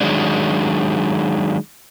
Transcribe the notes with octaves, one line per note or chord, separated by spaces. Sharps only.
D#3 F#3 G#3 D4